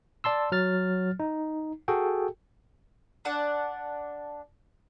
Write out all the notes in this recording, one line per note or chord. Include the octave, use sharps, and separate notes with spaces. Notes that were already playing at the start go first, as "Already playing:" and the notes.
D5 A5 C6 E6
F#3 F6 A6
D#4
F#4 G#4 A4 G5
D4 D5 F#5 A5